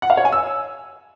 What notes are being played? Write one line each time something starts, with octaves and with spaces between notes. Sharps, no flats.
F#5
F5
C#5
G#5
E6